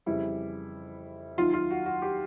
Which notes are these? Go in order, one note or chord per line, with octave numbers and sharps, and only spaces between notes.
F2 C#3 E3 G3 E4
D#2 D#3 F#3 F4
F4
F#4
F#4
G4